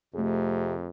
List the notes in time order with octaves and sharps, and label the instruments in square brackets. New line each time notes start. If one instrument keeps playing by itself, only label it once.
[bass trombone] F2 [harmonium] C3 [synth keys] A3 G#4